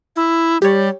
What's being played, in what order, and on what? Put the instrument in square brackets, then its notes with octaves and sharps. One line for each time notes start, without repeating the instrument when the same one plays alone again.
[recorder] E4
[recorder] G3 [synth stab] G4 C#5